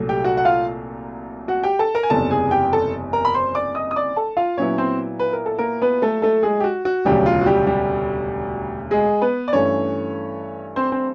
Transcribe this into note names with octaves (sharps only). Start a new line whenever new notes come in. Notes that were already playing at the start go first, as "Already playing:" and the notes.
Already playing: C2 A#2 F#3 A3
G4 G5
F#4 F#5
F#5
F4 F5
F#4 F#5
G4 G5
A4 A5
A#4 A#5
G#5
F#1 E2 C3 E3 G3 A4 A5
G#4 G#5
G4 G5
A4 A5
A#4 A#5
B5
C5 C6
D5 D6
D#5 D#6
D#6
D5 D6
A4 A5
F4 F5
A#2 F#3 B3 C#4 E4 C#5
C4 C5
B4
A#4
A4
A#3 A#4
B3 B4
A3 A4
A3 A4
G#3 G#4
G4
F#4
F#4
E1 D2 C#3 F#3 G3 G4
F4
F#4
G3 G4
G3 G4
G#3 G#4
B3 B4
D5
G2 E3 A3 C#4 C#5
C4 C5
C4 C5